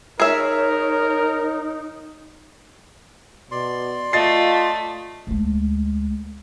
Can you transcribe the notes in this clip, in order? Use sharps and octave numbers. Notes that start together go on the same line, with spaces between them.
D#4 G#4 A#4 C#5 E5
B2 D5 C6
A3 F4 D#5 A6 C7
D2 G#3